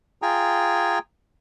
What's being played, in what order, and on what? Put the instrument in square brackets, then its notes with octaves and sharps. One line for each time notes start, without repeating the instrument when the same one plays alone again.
[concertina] F4 G#4 G5 G#5 A#5